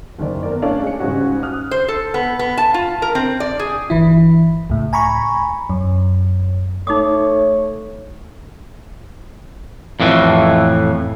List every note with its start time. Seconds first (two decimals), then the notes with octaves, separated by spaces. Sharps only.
0.19 F#1 D#3 D5
0.43 B3 A#4 D5
0.62 A3 C#4 D4 C#5 D5 F5
0.83 G#3 C#7
1.00 G#2 C#3 G3 C#4 F#4
1.43 D#6 F6 F#6
1.71 C5
1.88 A4
2.14 B3
2.39 B3
2.58 A5
2.74 F4
3.02 A#4
3.15 C4
3.40 D5
3.59 G#4
3.90 G1 E3 E4
4.70 C#2 A2
4.93 G#5 A#5 B5 C#6
5.70 F#2
6.87 A3 D#4 C#5 D6 D#6
10.00 F2 A2 E3